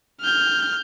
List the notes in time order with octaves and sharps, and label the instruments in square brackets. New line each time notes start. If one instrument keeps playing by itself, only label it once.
[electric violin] F6 G6